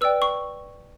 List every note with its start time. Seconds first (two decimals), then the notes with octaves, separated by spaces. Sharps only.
0.01 B4 D5 G5 E6
0.22 C#6